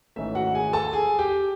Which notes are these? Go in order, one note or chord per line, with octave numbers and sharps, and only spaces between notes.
G#1 G#2 E3 A3 C#4 E5
F#4 F#5
G#4 G#5
A4 A5
G#4 G#5
G4 G5